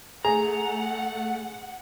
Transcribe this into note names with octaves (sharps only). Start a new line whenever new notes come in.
A3 G#4 F#5 A#5